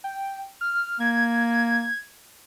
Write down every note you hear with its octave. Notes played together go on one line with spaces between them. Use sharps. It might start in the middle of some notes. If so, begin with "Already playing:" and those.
G5
F6
A#3 G#6